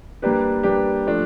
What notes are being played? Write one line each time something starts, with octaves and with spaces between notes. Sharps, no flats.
G3 A#3 D4 G4 B4
G3 A#3 D4 G4 B4
F3 A3 D4